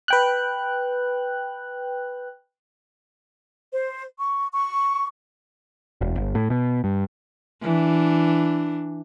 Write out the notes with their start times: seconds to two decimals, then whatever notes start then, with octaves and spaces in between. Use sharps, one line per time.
0.08 B4 G5 F#6
3.73 C5
4.18 C#6
4.53 C#6
6.01 E1
6.17 G1
6.35 A2
6.50 B2
6.84 G2
7.62 E3 D4